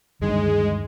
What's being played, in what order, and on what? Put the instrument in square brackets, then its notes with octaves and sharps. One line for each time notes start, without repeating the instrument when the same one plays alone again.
[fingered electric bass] D2 G2 D#3 [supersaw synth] G#3